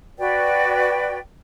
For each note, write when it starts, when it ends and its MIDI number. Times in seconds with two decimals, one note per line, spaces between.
0.19 1.19 66
0.19 1.19 71
0.19 1.19 74
0.19 1.19 79